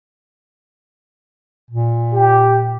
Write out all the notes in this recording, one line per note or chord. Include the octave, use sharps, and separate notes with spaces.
A#2
G4